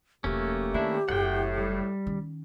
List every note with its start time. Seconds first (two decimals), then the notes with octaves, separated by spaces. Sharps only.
0.24 E1 F3 A3 A#3 C#4 G4
0.74 D#3 C4 D4 E4
1.09 F#1 F#2 A2 F#5 G5
1.58 G3
2.07 D#3 C#4